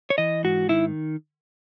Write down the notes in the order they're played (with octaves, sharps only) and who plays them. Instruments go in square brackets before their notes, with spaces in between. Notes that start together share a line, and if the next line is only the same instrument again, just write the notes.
[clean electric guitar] C#5
E3 D#5
G#2 F#4
D#3 E4